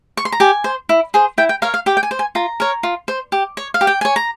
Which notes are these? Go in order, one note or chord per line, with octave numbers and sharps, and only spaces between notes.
C#6
C6
A#5
G4 G#5
C5
E4
G#4 C5
E4 G5
G5
A#4 C#5 F5
F5
G4 G5
G5
G#5
C5
G#5
F4 A#5
A#4 C#5
F4
C5
G4
C#5
F5
G4
G5
C#5 G#5
A#5